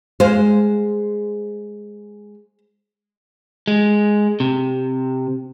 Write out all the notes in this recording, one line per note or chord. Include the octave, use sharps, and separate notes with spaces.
G#3 C5 F5
G#3
C3